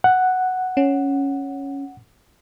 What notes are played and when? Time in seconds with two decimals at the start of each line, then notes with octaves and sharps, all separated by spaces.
0.04 F#5
0.77 C#4